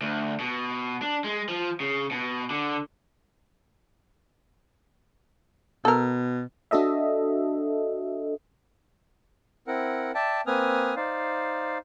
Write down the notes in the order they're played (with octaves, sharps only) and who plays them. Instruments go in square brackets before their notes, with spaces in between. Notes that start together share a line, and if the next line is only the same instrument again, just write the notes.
[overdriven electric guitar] D2
B2
D4
G#3
F3
C#3
B2
D3
[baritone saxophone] B2 [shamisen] A4 A#4
[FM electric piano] D4 F#4 A4 D#5 E5
[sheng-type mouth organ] C4 E4 A#4 F#5
D5 E5 G5 A5
A#3 C4 B4 G#5 D#6 F6
D#4 C5 D5 F5